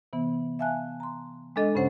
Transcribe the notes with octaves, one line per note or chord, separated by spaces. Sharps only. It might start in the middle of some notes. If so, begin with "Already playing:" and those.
C3 E3 B3
E5 F5 G#5 A5 F#6
A#5 C6
G#3 D4 A4 D#5
G2 C#3 C#4 C5 F#5